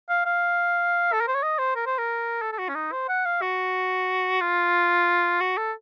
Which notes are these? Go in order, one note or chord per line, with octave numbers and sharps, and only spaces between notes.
F5
F5
A4
A#4
C5
C#5
D#5
C5
A#4
C5
A#4
A4
A4
F#4
C#4
D#4
C5
F#5
F5
F#4
F4
F#4
A4